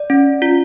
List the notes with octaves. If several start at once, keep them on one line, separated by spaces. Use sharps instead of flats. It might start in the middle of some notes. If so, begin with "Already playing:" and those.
Already playing: D5
C#4
F4